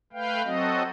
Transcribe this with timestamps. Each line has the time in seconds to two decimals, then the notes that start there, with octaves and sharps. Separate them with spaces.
0.13 A3 B4 F5 G5
0.44 F#3 C4 F#4 A4 D#5